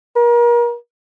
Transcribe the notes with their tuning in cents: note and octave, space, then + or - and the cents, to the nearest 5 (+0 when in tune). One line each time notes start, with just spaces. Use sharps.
A#4 +35